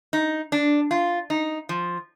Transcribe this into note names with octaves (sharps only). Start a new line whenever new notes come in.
D#4
D4
F4
D#4
F3